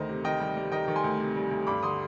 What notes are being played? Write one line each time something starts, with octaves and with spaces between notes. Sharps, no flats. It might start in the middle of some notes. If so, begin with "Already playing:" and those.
Already playing: D2 D#3 C5 D#5
C3
D#3 D#5 G5
G3
G3
D#3 D#5 G5
D#3
G#5 C6
D2
C3
G3
D2
G2 B5 D6
D3 C6 D#6